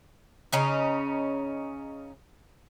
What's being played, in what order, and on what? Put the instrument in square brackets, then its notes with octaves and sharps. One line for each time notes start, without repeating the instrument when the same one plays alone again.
[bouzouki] C#3 C#4 D#4